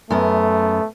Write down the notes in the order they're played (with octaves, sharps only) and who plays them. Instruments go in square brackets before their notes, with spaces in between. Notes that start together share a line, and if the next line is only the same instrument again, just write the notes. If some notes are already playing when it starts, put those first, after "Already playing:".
[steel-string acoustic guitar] F#2 B3 [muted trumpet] A3